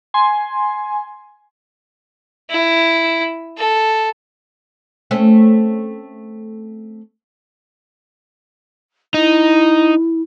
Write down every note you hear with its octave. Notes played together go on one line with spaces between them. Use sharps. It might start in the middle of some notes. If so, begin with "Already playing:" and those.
G#5 C6
E4
A4
A3 C4 C#4
D#4 E4